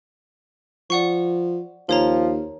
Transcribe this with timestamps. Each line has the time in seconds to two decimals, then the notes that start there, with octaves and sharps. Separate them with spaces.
0.90 F3 D5 F#5 C#6
1.89 D#2 F3 A#4 C#5 A#5